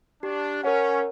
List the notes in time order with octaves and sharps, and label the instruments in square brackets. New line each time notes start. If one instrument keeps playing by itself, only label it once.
[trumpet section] D4 [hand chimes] G4
[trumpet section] C#4 [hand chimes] A#4 C#5 F#5